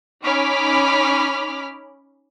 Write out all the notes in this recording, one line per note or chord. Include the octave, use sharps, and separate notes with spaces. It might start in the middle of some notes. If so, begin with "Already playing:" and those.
C#4 D#4 B5 D6 F6 B6